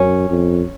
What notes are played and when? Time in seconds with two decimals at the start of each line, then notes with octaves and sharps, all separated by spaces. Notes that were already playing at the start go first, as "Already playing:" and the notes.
Already playing: F#2 C#4
0.30 F2